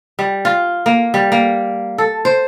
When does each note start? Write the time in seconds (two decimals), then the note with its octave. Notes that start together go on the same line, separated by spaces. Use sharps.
0.19 G3
0.45 F4
0.86 A#3
1.14 G3
1.32 A#3
1.98 A4
2.25 C5